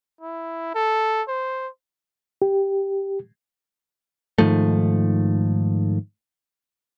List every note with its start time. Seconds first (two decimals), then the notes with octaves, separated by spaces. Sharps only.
0.21 E4
0.75 A4
1.28 C5
2.42 G4
4.38 G#2 D#3 F3 A3